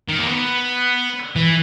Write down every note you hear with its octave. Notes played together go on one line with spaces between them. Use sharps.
D#3
A#3
B3
E3